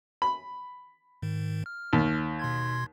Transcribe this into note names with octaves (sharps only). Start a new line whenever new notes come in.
B5
G#2 D#3
F6
D#2
B2 C6 G#6